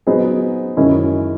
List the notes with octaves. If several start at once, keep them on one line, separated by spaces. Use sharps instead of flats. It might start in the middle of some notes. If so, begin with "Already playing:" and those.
F#3 B3 D#4 G#4 C5
F#2 D#3 G#3 C#4 E4